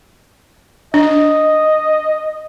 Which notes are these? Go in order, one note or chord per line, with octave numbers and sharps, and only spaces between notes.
D4 D#5